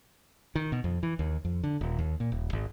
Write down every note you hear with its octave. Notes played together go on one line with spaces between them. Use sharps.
D#3
B2
F2
E3
D#2
F2
D3
D#1
D#2
A#2
D#1
G#1